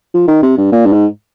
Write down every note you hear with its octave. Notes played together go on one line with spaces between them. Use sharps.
F3
D#3
C3
G2
A#2
G2
G#2